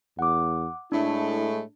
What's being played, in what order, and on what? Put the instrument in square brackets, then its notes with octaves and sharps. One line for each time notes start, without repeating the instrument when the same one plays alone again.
[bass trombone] E2 [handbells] F#5 D6
[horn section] A2 G#3 A3 [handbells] D4 [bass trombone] E4